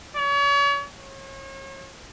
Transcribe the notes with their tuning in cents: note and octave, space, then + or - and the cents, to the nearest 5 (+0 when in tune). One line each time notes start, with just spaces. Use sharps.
C#5 +40
C#5 -40